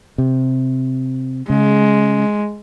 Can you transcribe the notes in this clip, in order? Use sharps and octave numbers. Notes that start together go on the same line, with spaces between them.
C3
C#3 G#3